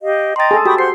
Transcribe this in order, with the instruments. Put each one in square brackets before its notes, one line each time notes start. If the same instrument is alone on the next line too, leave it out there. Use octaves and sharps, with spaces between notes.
[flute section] G4 D#5 F5
[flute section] D#5 G5 A#5 [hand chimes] C6 A6
[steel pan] G#4 A4
[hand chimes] F#4 [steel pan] G4 G5 [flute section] B5 C#6 D#6
[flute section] C5 F#5 C6 [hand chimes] C7